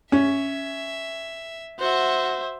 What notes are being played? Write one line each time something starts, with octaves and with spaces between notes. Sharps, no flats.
C#4 E5
F#4 C5 E5 F#5